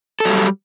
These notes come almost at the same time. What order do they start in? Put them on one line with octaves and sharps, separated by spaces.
A4 F#3 G3